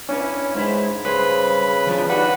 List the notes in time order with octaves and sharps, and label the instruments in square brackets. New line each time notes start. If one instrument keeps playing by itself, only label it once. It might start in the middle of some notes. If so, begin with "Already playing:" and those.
[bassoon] C#4 [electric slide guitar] D4 E4 B4
[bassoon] G#2 [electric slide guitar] G#3 E4 B4
[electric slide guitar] G2 C5 [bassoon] C#3 [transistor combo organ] B4
[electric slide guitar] E3 F3 D4
[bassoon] G3 [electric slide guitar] D#4 F#4 F#5 [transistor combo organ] B4